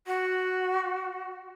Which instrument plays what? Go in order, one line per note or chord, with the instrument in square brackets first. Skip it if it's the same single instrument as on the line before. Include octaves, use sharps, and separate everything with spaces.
[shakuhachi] F#4